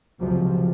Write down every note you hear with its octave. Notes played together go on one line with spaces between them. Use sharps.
C#2 C3 F3 F#3